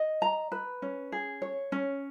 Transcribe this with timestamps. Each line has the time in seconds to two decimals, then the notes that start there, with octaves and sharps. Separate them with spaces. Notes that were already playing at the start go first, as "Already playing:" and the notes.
Already playing: D#5
0.22 A#5
0.52 B4
0.82 C#4
1.12 G#4
1.42 C#5
1.72 C#4